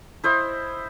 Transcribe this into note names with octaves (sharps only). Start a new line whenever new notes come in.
E4 C5 D#5